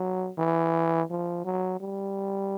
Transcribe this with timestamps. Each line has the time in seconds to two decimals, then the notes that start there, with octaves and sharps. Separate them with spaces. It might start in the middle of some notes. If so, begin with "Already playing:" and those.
Already playing: F#3
0.38 E3
1.10 F3
1.45 F#3
1.80 G3